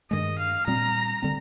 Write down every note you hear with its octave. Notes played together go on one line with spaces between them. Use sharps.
G2 D#3 G#3 D#5
F5
A#2 G3 C4 A#5
D3 G3 C4